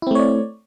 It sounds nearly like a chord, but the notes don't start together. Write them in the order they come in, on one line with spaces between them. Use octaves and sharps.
E4 C4 A3 C#5 D5